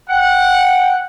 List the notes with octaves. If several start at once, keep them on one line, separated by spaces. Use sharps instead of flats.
F#5 G5